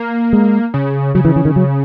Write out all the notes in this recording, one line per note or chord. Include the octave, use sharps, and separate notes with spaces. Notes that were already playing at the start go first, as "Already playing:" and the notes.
Already playing: A#3
G#3
C#3
C#3 F#3
E3
E3
D#3
F#3